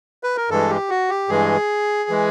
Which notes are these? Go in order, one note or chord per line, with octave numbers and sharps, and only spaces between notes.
B4
A#4
G2 E3 G#3 A4
G4
F#4
G4
G2 E3 G#3 G#4
E3 G#3